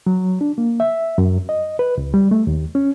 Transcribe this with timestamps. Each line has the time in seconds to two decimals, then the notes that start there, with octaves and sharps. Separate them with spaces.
0.06 F#3
0.41 D4
0.58 A#3
0.80 E5
1.18 F#2
1.49 D#5
1.79 B4
1.98 C#2
2.14 G3
2.31 A3
2.47 D#2
2.75 C#4